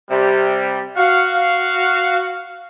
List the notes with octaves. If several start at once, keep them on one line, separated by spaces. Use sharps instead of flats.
C3 G3
F#4 F5